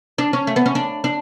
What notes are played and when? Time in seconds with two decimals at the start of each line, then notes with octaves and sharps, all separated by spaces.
0.18 D4
0.33 C#4
0.47 A3
0.56 B3
0.66 C#4
0.75 D4
1.04 D4